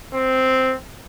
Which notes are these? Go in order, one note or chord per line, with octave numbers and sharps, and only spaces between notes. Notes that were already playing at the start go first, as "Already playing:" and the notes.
C4